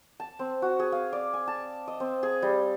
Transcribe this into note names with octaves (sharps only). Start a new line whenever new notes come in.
A5
C4
F#4
G#4
F5
D5
G#5
A5
D#5
C4
G#4
G3